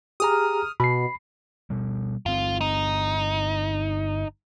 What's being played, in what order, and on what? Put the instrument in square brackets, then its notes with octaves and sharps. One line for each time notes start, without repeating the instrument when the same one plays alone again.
[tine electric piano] G4 G#4 A#5 [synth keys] D#6 F6
[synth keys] B2 [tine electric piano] B5 C7
[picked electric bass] B2 G3
[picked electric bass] G1 C4 [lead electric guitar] F4
[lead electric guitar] D#4